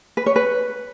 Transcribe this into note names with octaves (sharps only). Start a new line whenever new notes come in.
B4
C#5
B4